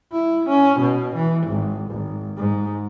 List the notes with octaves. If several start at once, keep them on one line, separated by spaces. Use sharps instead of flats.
E4
C#4
B2
E3
G#1
G#1
G#2